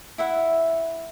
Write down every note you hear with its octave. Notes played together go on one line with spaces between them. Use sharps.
E4 E5 F#5